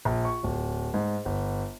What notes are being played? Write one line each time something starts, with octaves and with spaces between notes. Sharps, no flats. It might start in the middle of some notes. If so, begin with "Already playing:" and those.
A#1
C#6
D1
G#2
G1